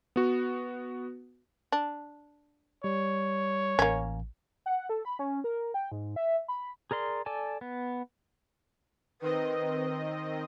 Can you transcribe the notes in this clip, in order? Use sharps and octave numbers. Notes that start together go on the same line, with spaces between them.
B3 F#4
D4
G3 C#5
A1 A#3 C#4
F#5
A4
B5
C#4
A#4
G5
G#2
E5
B5
G#4 A#4 D5 C6
A4 D5 G#5 A5
B3
D#3 C4 B4 D#5